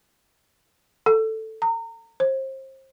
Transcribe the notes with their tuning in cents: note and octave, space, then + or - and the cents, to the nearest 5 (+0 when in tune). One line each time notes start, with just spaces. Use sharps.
A4 +5
A#5 -30
C5 +30